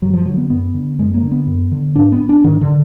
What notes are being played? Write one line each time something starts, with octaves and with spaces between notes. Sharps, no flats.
F#2 F#3
F3
D3 F#3
B3
F#2 B3
D3
F#2 G#3
A#3
D3
B3
F#2
D3
G#2 D4
B3
D4
G#2 D#3
D3